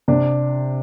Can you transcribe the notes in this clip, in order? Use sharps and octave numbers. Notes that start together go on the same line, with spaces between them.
C3 D4